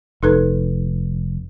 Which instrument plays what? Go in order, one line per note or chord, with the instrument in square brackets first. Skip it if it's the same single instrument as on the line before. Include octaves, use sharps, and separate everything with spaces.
[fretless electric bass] F1 [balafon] D#4 A4 B4